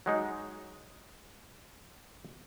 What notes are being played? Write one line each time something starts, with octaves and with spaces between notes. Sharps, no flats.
F#3 G#3 D#4